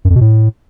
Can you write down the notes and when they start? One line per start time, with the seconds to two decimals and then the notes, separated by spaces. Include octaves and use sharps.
0.05 F#2
0.10 F2
0.16 B2
0.21 A2